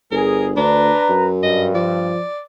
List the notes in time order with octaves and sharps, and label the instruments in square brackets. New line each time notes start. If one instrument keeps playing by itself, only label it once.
[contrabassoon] G1 [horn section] G#4 [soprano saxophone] A#4
[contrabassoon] D2 [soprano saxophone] D4 [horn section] B4 A#5
[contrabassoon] F#2
[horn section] G2 [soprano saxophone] D#5
[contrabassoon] F3 [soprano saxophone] D5